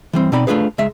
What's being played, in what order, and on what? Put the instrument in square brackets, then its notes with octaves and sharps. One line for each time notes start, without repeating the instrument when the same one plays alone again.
[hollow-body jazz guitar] E3 G3 C4
B2 C4 D#4 D5 B5
A3 C4 D4 F4 G#4 B4
C#2 G#3 E5